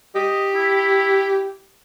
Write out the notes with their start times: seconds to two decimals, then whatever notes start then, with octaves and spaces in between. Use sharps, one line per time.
0.15 G4 D#5
0.55 E4